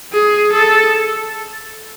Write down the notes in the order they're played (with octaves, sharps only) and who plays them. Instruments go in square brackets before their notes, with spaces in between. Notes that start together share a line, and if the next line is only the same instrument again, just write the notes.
[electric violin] G#4
A4